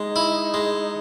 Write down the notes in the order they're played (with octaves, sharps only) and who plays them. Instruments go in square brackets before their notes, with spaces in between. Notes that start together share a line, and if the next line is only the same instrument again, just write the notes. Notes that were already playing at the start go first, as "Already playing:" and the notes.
Already playing: [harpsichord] G#3 [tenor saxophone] D#4
[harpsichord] E4
G#3